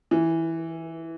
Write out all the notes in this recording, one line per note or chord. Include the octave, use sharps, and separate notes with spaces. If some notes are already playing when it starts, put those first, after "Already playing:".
E3